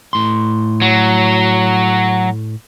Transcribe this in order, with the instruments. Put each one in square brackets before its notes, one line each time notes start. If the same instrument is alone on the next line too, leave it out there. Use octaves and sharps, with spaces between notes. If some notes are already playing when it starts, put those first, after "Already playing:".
[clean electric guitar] A2 C6
[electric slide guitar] F#3